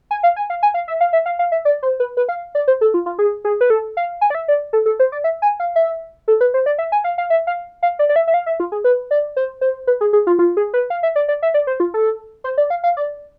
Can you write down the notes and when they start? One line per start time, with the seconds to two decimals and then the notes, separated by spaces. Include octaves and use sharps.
0.11 G#5
0.23 F5
0.36 G#5
0.50 F5
0.63 G#5
0.74 F5
0.88 E5
1.01 F5
1.13 E5
1.26 F5
1.39 F5
1.52 E5
1.65 D5
1.83 C5
2.00 B4
2.17 B4
2.29 F5
2.55 D5
2.68 C5
2.81 A4
2.94 F4
3.06 F4
3.19 G#4
3.45 G#4
3.61 B4
3.70 A4
3.97 F5
4.21 G#5
4.30 D5
4.35 E5
4.48 D5
4.73 A4
4.86 A4
5.00 C5
5.12 D5
5.24 E5
5.42 G#5
5.60 F5
5.76 E5
6.28 A4
6.41 B4
6.54 C5
6.66 D5
6.78 E5
6.92 G#5
7.04 F5
7.18 F5
7.30 E5
7.47 F5
7.83 F5
7.99 D5
8.09 D5
8.16 E5
8.27 E5
8.34 F5
8.46 E5
8.60 F4
8.72 G#4
8.84 B4
9.11 D5
9.36 C5
9.61 C5
9.87 B4
10.01 G#4
10.13 G#4
10.27 F4
10.39 F4
10.57 G#4
10.74 B4
10.90 F5
11.03 E5
11.16 D5
11.28 D5
11.42 E5
11.54 D5
11.67 C5
11.80 F4
11.94 A4
12.44 C5
12.58 D5
12.70 F5
12.83 F5
12.97 D5